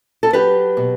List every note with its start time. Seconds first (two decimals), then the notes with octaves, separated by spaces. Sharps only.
0.23 A4
0.33 F#3 G4 B4
0.77 B2